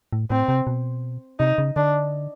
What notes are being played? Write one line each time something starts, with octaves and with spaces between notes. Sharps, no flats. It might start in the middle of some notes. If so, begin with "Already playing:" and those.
A2
A2 C4
C3
B2
C3 D#4
C#3
D3 D4